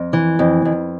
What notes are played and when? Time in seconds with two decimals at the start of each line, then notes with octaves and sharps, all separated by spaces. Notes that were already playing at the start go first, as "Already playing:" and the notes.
Already playing: F2
0.13 E3
0.39 F2
0.65 F2